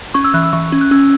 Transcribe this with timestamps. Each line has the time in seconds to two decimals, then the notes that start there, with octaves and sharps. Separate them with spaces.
0.14 C#4 C#6
0.24 E6
0.34 E3 F#6
0.43 E6
0.53 E3 C#6
0.72 C#4
0.81 F#6
0.91 C#4 E6